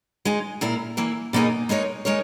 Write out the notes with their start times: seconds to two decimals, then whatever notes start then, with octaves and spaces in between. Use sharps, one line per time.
0.25 G#3 D#4 G#4
0.61 A#2 A#3 E4 A#4
0.97 E3 A#3 E4
1.33 B2 A#3 D#4 G#4
1.69 G#3 D#4 A#4 C#5
2.05 G#3 D#4 A#4 C#5